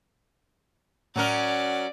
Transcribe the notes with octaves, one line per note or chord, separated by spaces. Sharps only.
A2 F#3 C#4 A#4 D5 F#5